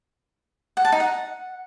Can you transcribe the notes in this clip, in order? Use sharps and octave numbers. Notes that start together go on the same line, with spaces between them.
F#5
A5
D#4
F#5